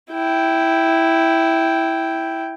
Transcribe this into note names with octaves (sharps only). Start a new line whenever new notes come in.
E4 G5